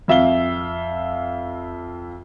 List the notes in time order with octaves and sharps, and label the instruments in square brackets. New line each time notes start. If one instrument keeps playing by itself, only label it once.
[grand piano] F2 E5 F5 G7